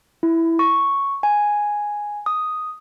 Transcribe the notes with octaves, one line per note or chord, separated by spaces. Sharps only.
E4
C#6
G#5
D#6